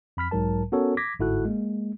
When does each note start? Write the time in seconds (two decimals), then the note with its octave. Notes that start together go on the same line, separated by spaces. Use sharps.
0.17 F2 B5 F6 B6
0.31 B1 G#2 F#3 A#4 A5
0.72 B3 C#4 F#4 A4 A#4 C#5
0.97 D6 G#6 A#6 B6
1.19 G1 G#2 E4 F#4 A4 F#6
1.45 G#3 A#3